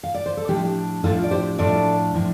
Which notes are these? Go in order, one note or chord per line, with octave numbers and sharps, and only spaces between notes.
F5
D5
C5
A4
A2 F3 D4 G4
A2 F3 D4 F4 A4
D5
G4 C5
A2 F3 D4 A4 D5
A2 F3 D4